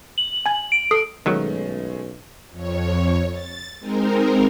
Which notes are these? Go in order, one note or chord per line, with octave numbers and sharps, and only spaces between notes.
F#7
G#5 G#6
D7
A4 D#6 C7
B1 D#3 F#3 G#3 A3 C#4
F2 C#5
A6
G#3 C4 D#4 A#4